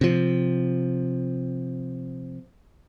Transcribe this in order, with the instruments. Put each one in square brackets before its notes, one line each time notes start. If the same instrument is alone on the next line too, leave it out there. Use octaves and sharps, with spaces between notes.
[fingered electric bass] C3 F3